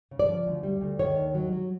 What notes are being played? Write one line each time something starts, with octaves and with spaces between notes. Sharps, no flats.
C#3
D5
F3
D2
G3
D2
D#3 C#5
D#2
F#3
F#3